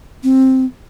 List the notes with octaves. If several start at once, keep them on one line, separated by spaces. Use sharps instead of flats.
C4